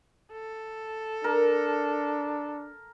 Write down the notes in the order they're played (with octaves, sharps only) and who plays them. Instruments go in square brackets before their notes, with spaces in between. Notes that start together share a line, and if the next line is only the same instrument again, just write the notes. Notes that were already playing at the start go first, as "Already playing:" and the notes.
[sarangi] A4
[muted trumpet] D4 [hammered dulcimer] A#4